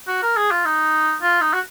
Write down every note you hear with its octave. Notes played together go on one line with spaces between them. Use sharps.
F#4
A#4
G#4
F4
D#4
F4
D#4
F#4